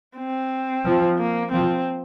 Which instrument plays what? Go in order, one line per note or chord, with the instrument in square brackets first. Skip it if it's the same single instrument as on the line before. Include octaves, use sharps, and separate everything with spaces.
[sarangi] C4
[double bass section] F3
[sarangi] A#3
[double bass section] F3 [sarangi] C4